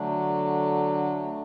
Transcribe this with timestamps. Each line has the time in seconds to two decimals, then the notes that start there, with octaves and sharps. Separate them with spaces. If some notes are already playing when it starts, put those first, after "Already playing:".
Already playing: D3 F#3 A3 D4
1.27 A3